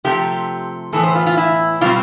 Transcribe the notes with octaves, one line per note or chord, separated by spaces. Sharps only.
C3 F3 A3 C4 G4
A2 E3 B3 A4
C5
F4
F4
E4
B2 G3 C4 F4